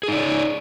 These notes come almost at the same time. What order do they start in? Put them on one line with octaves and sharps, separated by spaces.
G#4 D#4 D5 C#5